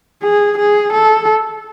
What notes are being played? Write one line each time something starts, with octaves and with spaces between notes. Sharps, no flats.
G#4
G#4
A4